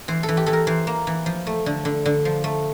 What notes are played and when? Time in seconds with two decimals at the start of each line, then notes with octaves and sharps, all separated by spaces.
0.08 E3 C5
0.23 A4
0.28 E3
0.37 G4
0.46 E3 A4
0.53 A#4
0.67 E3 C5
0.87 A#3
1.07 E3
1.26 F3
1.47 A3
1.66 D3
1.85 D3
2.06 D3
2.25 F3
2.44 A3